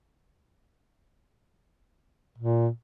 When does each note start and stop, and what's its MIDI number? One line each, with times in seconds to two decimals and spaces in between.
2.38 2.68 46